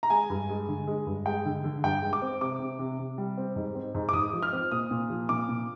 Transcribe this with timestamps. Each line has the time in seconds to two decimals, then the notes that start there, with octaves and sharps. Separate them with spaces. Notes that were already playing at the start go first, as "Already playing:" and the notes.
0.03 A#5
0.10 G#3 G#5
0.30 G2
0.49 G#3
0.68 D3
0.87 G#3
1.07 G2
1.26 G#3 G5
1.45 D3
1.64 D3
1.84 G2 G5
2.02 G#3
2.13 D6
2.22 C4
2.41 C3 D6
2.60 C3
2.79 C3
2.99 C3
3.18 G3
3.38 C4
3.56 G#2
3.75 C4
3.95 G#2
4.09 D6
4.13 G#2 D#6
4.34 F3
4.43 F6
4.53 C4
4.72 A#2 D#6
4.91 A#2
5.10 F3
5.29 A#2 D6
5.49 A#2